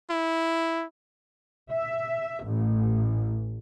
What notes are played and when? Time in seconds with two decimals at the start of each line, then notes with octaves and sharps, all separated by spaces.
0.10 E4
1.72 E5
2.47 A1